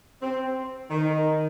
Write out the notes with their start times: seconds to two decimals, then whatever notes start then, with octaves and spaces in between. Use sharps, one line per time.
0.22 C4
0.90 D#3